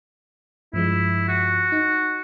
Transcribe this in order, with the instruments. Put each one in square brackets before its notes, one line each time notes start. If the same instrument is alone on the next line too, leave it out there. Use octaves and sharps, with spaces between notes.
[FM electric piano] G2 F3 G#3 [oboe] E4
[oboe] F#4
[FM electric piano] D#4